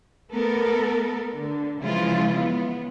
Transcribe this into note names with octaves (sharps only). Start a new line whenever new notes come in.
A3 B3 A4 A#4
D3
C#3 E3 F3 G#3 E4 F4
B3